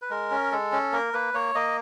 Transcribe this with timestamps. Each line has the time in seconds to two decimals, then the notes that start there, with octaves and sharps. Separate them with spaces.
0.02 B4
0.10 G#3 A#4
0.31 C#4
0.52 G#3 A4
0.72 C#4
0.92 A#3 A#4
1.13 A#3 B4
1.34 A#3 C#5
1.55 A#3 D#5